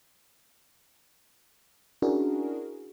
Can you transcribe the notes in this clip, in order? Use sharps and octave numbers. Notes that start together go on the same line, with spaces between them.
C#4 D4 E4 F#4 G#4 A#4